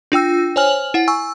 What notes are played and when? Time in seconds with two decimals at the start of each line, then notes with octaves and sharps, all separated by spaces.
0.12 D4 F4 G5 E6
0.56 C5 C#5 G#5 F6 F#7
0.94 E4 F#5
1.08 G#5 C#6 E6